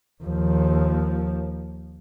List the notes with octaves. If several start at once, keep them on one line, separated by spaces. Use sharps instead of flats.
D#2 F3